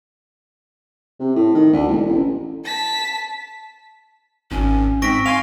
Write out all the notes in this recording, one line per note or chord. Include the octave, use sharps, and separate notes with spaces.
C3
A2
D#3
D2
E1
A1
A5 B6
G#1 C#4
G#2 C4 C#6 A#6 B6 D7
F5 G#5 C6 F7